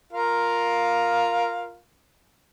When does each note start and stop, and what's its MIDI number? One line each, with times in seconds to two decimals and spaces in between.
0.13 1.77 65
0.13 1.77 70
0.13 1.77 77